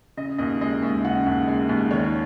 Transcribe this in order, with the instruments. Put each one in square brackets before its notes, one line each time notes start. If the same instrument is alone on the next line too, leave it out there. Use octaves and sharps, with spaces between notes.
[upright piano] C#3 D#5
D#2 D#5
G#3 D#5
D#2 E5
C#3 F#5
D#2
G#3
D#2
D#3 C#5